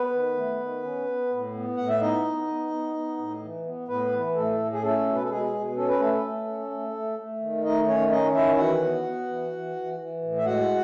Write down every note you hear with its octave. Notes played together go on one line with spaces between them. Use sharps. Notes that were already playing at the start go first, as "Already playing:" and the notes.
Already playing: B3 B4
D#3
A3
D#3
C#4
B3
A2
B3
A2 F#5
E5
B3 D#4 D#5
B3
B3
B3
B3
A2
E3
B3
A2 B3 B4
E3
A2 A3 A4
A2
G#4
A3 C#4 A4
B2
B4
A4
B2 G#3 G#4
B2
C#4 A4
B4
A3 A4
A3
C#4
A3
A3
A3
D#3
A3 D#4 D#5
D#3 C#4 C#5
C#4 D#4 D#5
D#3 E4 E5
E3 F#4 F#5
B3
B3
E3
E3
E3
E3
A2
E5
G#3 F#4 F#5